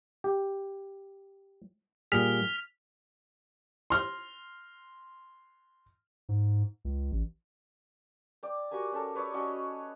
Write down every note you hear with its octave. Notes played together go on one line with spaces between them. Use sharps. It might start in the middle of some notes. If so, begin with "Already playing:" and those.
G4
A#2 G3 G#4 F6 B6 F7
C6 F6
G#2
C#2
A1
D5 G5
F#4 G4 A#4 G#5
C#4 G4 A4 A#4
B4 C#5 D5 E5
C#4 F#4 C#5 D#5